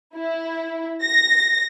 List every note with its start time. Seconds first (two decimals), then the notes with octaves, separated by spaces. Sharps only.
0.15 E4
1.04 A#6